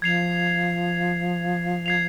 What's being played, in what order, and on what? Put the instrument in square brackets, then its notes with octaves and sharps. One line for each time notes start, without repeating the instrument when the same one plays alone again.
[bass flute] F3 [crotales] G#6 C7 F7
[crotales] G#6 C7 F7